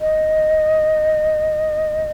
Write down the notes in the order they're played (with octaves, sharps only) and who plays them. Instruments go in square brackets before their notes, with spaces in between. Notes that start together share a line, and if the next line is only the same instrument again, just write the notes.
[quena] D#5